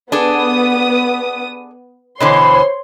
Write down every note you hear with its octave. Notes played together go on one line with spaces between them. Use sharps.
B3 D4 G#4 A4 D#6
B2 D3 E3 C5 C#5 C6